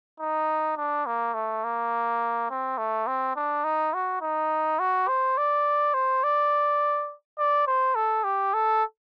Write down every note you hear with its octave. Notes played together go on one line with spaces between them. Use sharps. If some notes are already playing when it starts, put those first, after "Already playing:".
D#4
D4
A#3
A3
A#3
C4
A3
C4
D4
D#4
F#4
D#4
F#4
C5
D5
C5
D5
D5
C5
A4
G4
A4